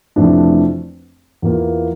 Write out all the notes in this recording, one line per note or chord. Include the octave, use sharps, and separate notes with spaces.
F1 F2 E3 A3 D4
E2 E3 A#3 F4